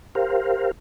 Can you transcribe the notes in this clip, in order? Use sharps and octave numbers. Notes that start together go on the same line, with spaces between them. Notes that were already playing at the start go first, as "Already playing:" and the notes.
G4 A#4 C5 F5